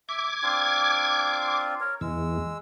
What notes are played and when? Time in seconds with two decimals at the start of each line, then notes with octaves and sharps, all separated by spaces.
0.09 E5 D6 G#6
0.43 C4 D4 F4
1.80 A#4 C#5
2.01 E2 G#3 E6